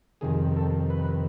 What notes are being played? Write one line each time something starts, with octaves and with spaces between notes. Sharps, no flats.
F2 C3 D#3 G#4
A4
B4